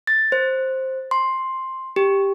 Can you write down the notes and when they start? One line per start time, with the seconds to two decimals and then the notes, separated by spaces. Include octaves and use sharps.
0.07 A6
0.32 C5
1.11 C6
1.96 G4